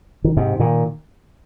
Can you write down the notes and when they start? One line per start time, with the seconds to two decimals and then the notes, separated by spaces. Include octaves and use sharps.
0.24 D#3
0.37 G#2 C3
0.60 A#2 D#3